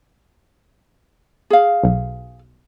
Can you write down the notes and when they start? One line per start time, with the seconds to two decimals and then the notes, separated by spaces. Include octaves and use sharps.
1.50 G#4 F5
1.84 B1